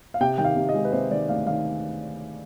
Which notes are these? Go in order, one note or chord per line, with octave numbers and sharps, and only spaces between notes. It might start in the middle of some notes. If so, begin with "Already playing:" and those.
F5
C3 G5
D#3 G5
F5
C3
D#5
G#3
B4
C3 C5
D#3 D5
D2 F5
D#3 F5